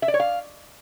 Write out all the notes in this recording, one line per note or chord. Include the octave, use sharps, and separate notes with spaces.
E5
D5
C#5
F5